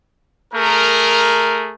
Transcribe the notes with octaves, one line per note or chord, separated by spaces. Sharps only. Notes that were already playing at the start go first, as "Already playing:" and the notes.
A3 G#4 A#4